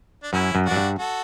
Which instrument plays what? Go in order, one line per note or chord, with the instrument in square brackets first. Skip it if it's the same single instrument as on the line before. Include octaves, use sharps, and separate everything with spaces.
[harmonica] D4
[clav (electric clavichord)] F#2 [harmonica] C#4 E4
[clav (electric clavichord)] F#2
[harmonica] D4 F#4
[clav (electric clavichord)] F#2
G2
[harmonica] F#4 A4